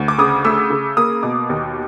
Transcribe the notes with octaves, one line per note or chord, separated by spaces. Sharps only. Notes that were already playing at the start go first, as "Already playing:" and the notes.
Already playing: D2
D6
C#3 D#6
A3 E6
C#3
A#3 D#6
B2 D6
D#2